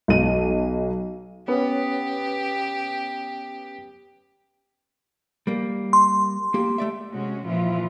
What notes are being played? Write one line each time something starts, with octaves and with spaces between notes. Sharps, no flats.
B1 D#7
B3 C#4 G4 B4 C#5
G3 A#3
C6
A#3 G4
A3 D5 E5
C3 G#3 C#4 F#4
A#2 E3 F3 E4 F4